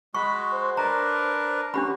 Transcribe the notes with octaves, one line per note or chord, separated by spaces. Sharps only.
G#3 F#4 B5 C#6
C5
D4 A#4 B4 A#5
C#4 D4 F#4 G4 B5